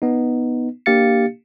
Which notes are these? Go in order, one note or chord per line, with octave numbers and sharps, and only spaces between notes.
B3 D#4
A#3 D4 G4 F5 A6 C#7